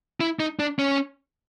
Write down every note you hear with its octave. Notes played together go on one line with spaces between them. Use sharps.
E4
D#4
D4
C#4